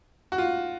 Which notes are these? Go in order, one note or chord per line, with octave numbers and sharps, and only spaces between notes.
F#4
F4